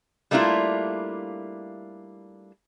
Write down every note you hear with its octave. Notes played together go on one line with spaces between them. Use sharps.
G3 A3 A#3 D4 E4 F4